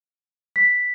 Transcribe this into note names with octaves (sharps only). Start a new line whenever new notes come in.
B6